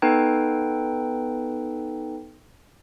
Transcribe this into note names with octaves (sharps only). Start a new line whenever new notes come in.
B3 D#4 A4 B4 G5